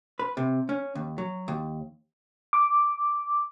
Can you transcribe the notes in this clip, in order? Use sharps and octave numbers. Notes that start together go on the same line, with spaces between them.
B4
C3
C#4
D#2
F#3
D#2
D6